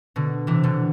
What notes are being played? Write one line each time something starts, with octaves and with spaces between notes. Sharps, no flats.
B2 D3
C3 E3
B2 D3